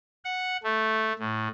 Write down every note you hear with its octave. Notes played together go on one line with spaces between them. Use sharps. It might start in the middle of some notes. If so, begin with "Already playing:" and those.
F#5
A3
A2